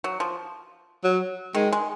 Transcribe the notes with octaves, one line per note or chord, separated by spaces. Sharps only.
F#3
F3
F#3
D#3 G#3
G#3